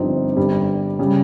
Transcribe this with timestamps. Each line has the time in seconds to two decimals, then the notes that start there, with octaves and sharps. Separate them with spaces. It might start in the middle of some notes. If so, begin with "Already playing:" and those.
Already playing: G1 G2 F3 C4 D#4
0.37 G1 G2 G3
0.99 C#3 G3